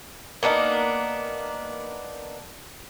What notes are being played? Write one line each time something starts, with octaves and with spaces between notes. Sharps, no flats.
A#3 B3 D4 D#4